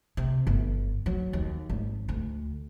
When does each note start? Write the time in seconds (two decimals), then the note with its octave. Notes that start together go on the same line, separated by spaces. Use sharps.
0.17 C3
0.47 G1
1.06 F#3
1.33 D#2
1.70 G#1
2.09 D2